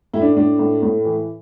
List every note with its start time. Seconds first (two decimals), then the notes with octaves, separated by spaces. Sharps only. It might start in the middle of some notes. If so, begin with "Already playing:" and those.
0.13 A2 E4
0.22 D4
0.37 A2 D4
0.59 A2
0.83 A2
1.05 E3